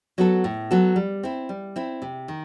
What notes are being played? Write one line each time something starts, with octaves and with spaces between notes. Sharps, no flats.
F#3 B3 F#4 A4
A2
F#3 B3 F#4 A4
G3
C4 E4
G3
C4 E4
C3
D#3